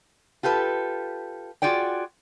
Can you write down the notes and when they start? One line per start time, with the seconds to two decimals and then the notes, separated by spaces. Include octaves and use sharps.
0.43 F4 G4 A4 B4
1.62 F4 F#4 G#4 D5 G5